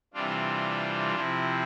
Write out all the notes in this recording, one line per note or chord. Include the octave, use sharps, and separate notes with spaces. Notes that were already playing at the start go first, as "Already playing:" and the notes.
C3 E3 G3 C4 D4 F4
C3 F3 C4 E4